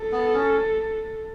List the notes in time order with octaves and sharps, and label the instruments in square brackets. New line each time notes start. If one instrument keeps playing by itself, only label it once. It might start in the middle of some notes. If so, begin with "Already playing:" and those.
Already playing: [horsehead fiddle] A4
[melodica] B3
C#4